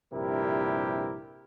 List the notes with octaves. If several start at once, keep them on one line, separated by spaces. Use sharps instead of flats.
A#1 G2 C3 E4 G4 A#4